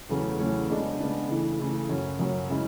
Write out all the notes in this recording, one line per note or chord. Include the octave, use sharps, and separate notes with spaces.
E2 C#3 F#3 A3 C#4
E2 C#3 F#3 A3 C#4
C#3 G#3 B3 D4
C#3 G#3 B3 D4
C#3 E3 A3
C#3 E3 A3
F#2 C#3 F#3 C#4
F#2 C#3 F#3 C#4
C#3 G#3 C#4 E4